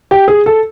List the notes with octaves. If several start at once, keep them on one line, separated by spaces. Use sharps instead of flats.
G4
G#4
A4